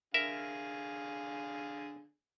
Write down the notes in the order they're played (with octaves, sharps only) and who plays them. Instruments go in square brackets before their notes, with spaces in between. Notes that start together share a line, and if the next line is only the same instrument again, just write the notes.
[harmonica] D3 G#4 F5 [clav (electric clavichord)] A#4 E5